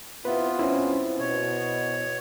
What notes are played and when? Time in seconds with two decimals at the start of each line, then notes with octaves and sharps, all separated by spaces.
0.25 C3 B3 C4 E4 F4 B4
0.59 G2 C4 C#4 E4 B4 C5
1.19 B2 C#5